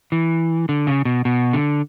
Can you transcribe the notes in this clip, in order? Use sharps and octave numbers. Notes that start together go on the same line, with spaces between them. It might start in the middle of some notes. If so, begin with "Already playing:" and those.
E3
D3
C#3
B2
B2
D3